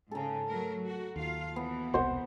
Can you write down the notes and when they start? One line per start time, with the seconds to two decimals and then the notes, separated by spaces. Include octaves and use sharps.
0.11 G#2 C#3 A4 A#5
0.49 F#3 A3 A#4
0.86 F#4
1.16 D#2 F4 F5
1.56 B2 E3 B3
1.94 E1 C2 C5 F#5